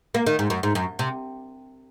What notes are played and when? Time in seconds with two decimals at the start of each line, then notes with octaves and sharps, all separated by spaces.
0.14 A#3
0.26 D#3
0.39 G#2
0.50 F#2
0.63 G#2
0.75 F#2
0.99 C3